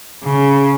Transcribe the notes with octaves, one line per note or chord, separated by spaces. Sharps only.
C#3